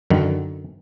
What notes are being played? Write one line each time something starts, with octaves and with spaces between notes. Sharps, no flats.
F#2 D3 D#3